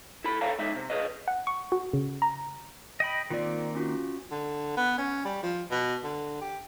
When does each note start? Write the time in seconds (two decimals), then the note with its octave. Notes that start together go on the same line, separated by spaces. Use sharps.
0.24 E4 A4 B5
0.41 A4 C#5 E5 F5 G5 A#5
0.59 G#3 D#4 E5
0.76 C3
0.90 G#4 A4 B4 C#5 D#5
1.28 F#5
1.47 C#6
1.72 F#4
1.93 C#3
2.22 A#5
3.00 D#5 G5 B5
3.30 D#3 A#3 C4 F4 D5
3.75 C#4 F4 F#4
4.31 D3
4.77 B3
4.98 C#4
5.25 G3
5.43 F3
5.71 B2
6.04 D3
6.41 G4